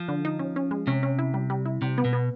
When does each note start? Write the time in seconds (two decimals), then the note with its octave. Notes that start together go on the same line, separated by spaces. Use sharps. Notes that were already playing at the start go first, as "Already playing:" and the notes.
Already playing: F3
0.08 D3
0.25 D#4
0.39 C#4
0.56 C#4
0.71 G#3
0.87 C3 C#4
1.03 C#4
1.19 E4
1.34 G3
1.50 G3
1.66 E4
1.82 C3 G3
1.98 B3
2.05 B2
2.13 B3